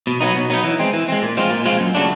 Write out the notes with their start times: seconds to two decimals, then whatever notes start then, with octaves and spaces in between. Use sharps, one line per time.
0.07 B2
0.21 F#3 B3 D#4
0.35 B2
0.50 F#3 B3 D#4
0.64 E3
0.79 G#3 C4
0.93 E3
1.08 G#3 C4
1.22 A#2
1.37 F3 G#3 C4 F4
1.50 A#2
1.65 F3 G#3 C4 F4
1.80 F#2
1.95 C#3 F#3 A3 D4